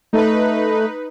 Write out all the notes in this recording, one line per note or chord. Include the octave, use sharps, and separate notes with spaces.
A3 D#4 B4